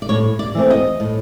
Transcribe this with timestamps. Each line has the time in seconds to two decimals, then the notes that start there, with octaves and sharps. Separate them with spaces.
0.02 D5
0.09 A2 C#5
0.39 D5
0.55 E3 A3 C4
0.70 D#5
1.00 A2